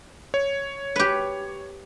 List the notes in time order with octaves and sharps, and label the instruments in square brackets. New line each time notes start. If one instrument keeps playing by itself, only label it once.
[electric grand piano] C#5
[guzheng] G4 B4